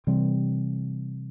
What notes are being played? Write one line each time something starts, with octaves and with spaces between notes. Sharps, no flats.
C3 E3 G3 C4